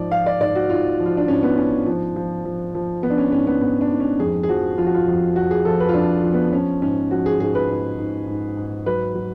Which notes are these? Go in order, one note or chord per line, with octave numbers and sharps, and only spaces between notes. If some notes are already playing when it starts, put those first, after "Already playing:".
Already playing: G#2 F3 D5
F3 F5
D5
G#2 D5
F#4
G#2 F4
F3
F4
D4
G#2 C#4
B3
G#2 C#4
F3
F3
F3
F3
F3 B3
D4
C#4
G#2 C#4
B3
G#2 B3
D4
G#2
C#4
F2 G#4
G#4
F3 F#4
F3 F4
F#4
F4
F2
F2 F#4
G#4
F3 A4
B4
F4
F2 D4
F3
B3
F3 C#4
G#2 C#4
F3 F#4
G#4
G#2 G#4
B4
G#2
G#2
G#2
G#2
F#3 B4
F#3